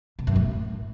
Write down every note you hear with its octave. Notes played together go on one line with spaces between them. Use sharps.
B2
F#2
A2